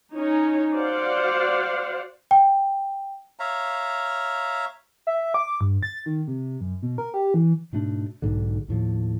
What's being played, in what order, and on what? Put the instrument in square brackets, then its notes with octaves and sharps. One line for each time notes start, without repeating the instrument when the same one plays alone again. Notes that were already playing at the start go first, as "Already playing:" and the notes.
[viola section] C#4 D#4 C#5
F#4 C5 D5 F5 F#5
[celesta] G5
[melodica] C#5 E5 F5 A#5
[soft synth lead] E5
D6
G2
A6
D#3
C3
F#2
B2
A#4
G4
E3
[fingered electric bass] G#2 B2 A3 D4
B1 G#2 D3
D#2 A2 F3